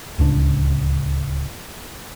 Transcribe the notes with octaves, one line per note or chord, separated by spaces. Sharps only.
D1 C#2 D4